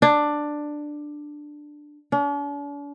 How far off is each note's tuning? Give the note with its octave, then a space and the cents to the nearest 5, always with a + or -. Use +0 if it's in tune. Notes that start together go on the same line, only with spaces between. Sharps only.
D4 +10
D4 -45